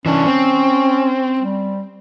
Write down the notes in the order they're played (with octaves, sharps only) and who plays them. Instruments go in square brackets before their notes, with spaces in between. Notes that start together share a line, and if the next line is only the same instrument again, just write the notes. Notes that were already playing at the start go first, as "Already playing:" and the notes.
[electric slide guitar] E3 D4 [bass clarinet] C#4
[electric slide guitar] C4
[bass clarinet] G3